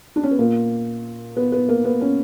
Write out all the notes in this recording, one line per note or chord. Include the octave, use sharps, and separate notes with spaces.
D4
C#4
B3
A#2 A#3
B3
B3
A#3
B3
C#4